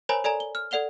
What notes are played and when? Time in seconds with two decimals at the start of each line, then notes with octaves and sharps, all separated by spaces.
0.09 A#4 C5 C#5 G#5 A#5 B5
0.24 A4 D5 G#5 A#5
0.40 G7
0.55 F6
0.71 A4 D5 F#5 F7 G7